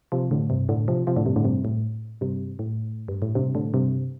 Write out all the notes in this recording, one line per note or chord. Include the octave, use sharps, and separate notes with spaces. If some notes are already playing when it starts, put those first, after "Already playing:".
C3 F3
A2 D3
G2 C3
A2 D3
C3 F3
C3 F3
A2 D3
G2 C3
A2 D3
G2 C3
A2
G2 C3
A2
G2
A2
G2 C3
A2 D3
G2 C3